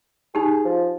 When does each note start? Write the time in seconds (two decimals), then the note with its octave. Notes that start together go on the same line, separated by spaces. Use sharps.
0.35 D#4 G4 G#4
0.65 F3